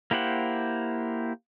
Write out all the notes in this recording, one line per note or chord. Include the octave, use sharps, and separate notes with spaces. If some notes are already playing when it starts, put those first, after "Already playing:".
A#3 E4 G4 C5 F#5